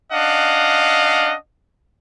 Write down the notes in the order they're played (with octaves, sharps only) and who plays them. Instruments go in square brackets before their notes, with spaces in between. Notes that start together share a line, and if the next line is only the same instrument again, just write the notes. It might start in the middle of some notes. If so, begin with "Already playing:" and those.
[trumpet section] C#4 D4 D#5 F5 F#5